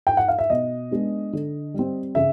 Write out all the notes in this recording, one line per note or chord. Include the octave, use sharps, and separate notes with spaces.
G5
F#5
F5
E5
B2 D#5
G#3 B3 D4
D3
G3 C4
C#3 E5